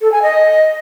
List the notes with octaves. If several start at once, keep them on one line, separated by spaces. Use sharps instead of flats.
A4
G#5
D#5